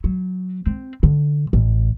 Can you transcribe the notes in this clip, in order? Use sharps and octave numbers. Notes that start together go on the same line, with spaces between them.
F#3
C4
D3
A1